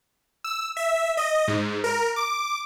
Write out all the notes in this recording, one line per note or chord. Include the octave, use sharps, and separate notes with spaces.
E6
E5
D#5
G#2
A#4
D6